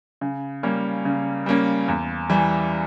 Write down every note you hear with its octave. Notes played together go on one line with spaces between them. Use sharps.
C#3
G3 A#3 C#4
C#3
G3 A#3 C#4
E2
E3 G3